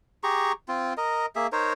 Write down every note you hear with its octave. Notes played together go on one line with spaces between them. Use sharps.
G4 G#4 A#5 C#6
C4 F4
A#4 D#5
A#3 G#4 E5
D#4 A#4 C5 C#5